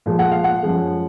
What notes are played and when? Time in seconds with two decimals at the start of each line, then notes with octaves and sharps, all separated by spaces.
0.06 A#2 F3 G#3
0.19 F#5
0.32 F5
0.44 F#5
0.63 F#2 F3 G#3